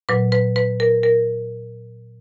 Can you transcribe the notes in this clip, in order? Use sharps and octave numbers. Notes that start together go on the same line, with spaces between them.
A#2 F#3 B4
B4
B4
A#4
A#4